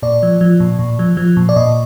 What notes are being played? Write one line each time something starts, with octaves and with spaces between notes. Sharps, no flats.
A#2 D5
F3
F3
A#2
A#2
F3
F3
A#2
D5
A#2 D#5